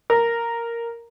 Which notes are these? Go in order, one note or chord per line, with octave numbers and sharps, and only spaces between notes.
A#4